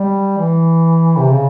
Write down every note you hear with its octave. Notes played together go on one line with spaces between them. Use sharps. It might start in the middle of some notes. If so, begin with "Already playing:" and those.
Already playing: G3
E3
C3
C#3